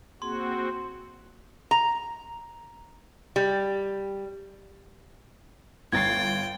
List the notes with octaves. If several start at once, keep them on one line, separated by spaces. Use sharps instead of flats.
A#3 C4 F#4 G#4 C6
A#5
G3
G1 G5 G#6 A6 C7